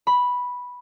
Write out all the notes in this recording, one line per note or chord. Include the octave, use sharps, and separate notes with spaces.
B5